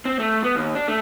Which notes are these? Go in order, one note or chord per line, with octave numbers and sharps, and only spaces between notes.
C4
A3
B3
D#2
D4
A3